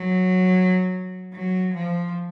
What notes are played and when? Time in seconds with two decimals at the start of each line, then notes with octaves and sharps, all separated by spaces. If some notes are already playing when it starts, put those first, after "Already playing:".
Already playing: F#3
1.34 F#3
1.74 F3